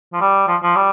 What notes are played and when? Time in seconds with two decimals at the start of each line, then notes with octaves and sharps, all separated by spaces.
0.13 F3
0.21 G3
0.48 F3
0.63 F3
0.76 G3